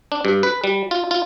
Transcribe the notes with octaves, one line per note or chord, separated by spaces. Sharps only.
D4
G2
B4
G3
F4
F4